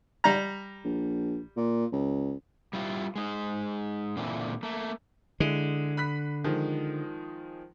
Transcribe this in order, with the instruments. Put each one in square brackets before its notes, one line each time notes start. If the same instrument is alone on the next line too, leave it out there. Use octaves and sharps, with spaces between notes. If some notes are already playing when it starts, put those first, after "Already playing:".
[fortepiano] G3 A#5
[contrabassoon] A#1
A#2
C#2
[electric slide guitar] G3 E4 F4
G#3 D#4
A#2 D3 E3 C4
A3 A#3
[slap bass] D3 [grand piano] G#3 E4
[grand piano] B5 F#6 B6
D#3 F3 G#3